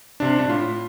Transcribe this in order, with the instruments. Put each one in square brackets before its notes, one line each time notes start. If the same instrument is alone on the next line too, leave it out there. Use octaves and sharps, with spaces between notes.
[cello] C3 [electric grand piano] D4
[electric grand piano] D4
[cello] A2 [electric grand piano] F4